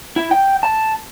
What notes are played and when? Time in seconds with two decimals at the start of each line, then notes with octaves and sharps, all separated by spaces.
0.16 E4
0.31 G5
0.63 A5